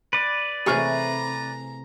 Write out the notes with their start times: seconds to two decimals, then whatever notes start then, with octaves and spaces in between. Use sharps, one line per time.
0.13 B4 D5
0.66 C3 E3 A3 G#4 A#5 C#6 F6